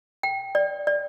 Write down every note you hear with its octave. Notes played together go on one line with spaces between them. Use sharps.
G5
D5
D5